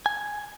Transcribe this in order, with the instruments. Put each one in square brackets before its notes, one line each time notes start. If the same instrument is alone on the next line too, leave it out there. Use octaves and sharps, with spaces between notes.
[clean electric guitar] G#5